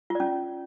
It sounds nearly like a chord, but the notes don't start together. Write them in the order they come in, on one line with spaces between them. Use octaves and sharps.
F4 D5 C#4